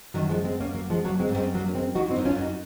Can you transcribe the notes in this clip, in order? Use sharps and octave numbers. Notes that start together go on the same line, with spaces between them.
F#2 D#3 F#3
F3 G#3
G#3 C4
A#3 C#4
F#3 A#3
F3 G#3
F#3 A#3
G#3 C4
G#2
F#2 G#3 C4
F#3 A#3
C#4
G#3 C4
F2 D#4 F#4
C4 D#4
F#2
C#4 F4
F#2
D#4 F#4